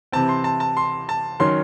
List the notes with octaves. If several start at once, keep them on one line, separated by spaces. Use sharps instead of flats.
C3 E3 C4 A5
C6
A5
A5
C6
A5
D#3 F#3 C#4 C6